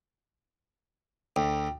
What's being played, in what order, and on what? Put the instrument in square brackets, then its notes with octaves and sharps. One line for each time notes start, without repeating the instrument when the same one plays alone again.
[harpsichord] D2 [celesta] G5